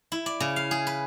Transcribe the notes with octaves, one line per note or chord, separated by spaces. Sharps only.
E4
D5
C#3
F5
G#4
B4